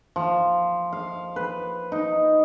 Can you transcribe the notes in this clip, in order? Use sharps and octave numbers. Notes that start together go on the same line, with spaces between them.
F3
F5
B4
D#4